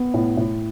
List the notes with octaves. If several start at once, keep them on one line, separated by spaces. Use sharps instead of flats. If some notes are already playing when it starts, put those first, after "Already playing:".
Already playing: B3
A2
A2